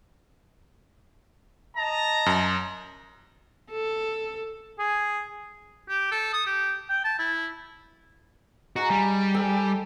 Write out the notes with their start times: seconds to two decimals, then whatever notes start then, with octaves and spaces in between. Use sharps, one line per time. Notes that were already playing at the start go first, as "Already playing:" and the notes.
1.77 D#5 A5 A#5
2.26 F#2
3.72 A4
4.79 G#4
5.89 G4
6.11 A4
6.33 D#6
6.46 G4
6.89 G5
7.04 A5
7.19 E4
8.76 D#4 F#4 G#4
8.90 G3
9.34 A4 G5 G#5